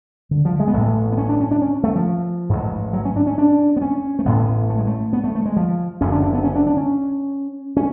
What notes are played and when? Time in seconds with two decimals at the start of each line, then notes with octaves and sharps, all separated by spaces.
0.31 D3
0.45 F3
0.60 G#3
0.68 B3
0.74 A1 A2 A3
1.12 B3
1.18 C#4
1.29 D4
1.40 C#4
1.51 D4
1.62 C#4
1.83 A3
1.95 F3
2.49 A1 G#2
2.93 F#3
3.05 C#4
3.16 D4
3.27 C#4
3.38 D4
3.76 B3
3.81 C#4
4.19 A3
4.25 A1 A2 B3
4.70 A3
4.78 G#3
4.87 A3
5.13 B3
5.24 A3
5.35 A3
5.45 G#3
5.56 F3
6.01 F#1 F#2 D3 C#4
6.12 D4
6.23 D4
6.33 B3
6.44 C#4
6.55 D4
6.67 D4
6.77 C#4
7.76 C#4